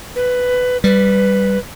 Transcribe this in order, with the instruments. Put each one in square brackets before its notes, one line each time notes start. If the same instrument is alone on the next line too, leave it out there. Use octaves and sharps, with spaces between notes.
[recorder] B4
[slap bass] G3 [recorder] B4